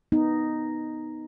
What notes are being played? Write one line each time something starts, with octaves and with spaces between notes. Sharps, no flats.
B3 D#4